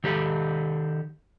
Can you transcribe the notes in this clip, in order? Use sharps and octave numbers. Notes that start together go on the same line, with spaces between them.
D#3 G4 A4